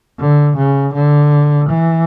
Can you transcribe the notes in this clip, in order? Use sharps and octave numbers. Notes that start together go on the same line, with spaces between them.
D3
C#3
D3
E3